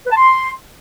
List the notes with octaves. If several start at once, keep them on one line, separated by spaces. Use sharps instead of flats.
B4
A5
C6